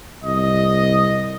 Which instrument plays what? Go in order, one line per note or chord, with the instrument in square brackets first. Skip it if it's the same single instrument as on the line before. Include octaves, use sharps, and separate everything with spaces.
[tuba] C2 [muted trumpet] D#5